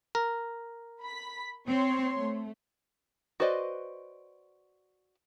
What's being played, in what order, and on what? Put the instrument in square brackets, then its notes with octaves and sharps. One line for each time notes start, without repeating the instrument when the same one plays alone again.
[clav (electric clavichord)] A#4
[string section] B5 B6
[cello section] C4 [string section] C#5 C6
[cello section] A3
[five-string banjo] F#4 B4 C5 D5 D#5